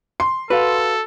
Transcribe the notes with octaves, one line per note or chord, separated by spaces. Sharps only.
C6
F#4 A4 B4 F5